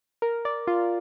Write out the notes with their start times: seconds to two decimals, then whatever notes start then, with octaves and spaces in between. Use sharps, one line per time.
0.22 A#4
0.45 D5
0.67 F4